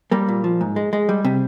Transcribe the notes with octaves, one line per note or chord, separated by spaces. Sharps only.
G3 A#3
A#2
F3
G#2
G#3
G#3
G3
C3